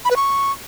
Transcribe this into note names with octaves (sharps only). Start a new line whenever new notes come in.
B5
B4
C#6